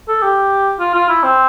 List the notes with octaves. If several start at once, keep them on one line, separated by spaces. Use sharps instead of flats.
A4
G4
F4
F4
E4
C4